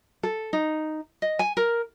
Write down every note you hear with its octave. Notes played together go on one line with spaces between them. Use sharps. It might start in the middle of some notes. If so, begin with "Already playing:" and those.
A4
D#4
D#5
G#5
A#4